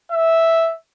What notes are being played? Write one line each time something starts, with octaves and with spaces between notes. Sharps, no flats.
E5